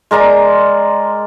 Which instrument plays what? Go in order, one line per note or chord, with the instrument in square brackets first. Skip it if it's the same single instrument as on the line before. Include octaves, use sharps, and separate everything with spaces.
[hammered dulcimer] G#3 A#4 D5 A#5